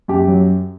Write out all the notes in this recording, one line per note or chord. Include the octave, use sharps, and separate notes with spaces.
F#2 G4
F#3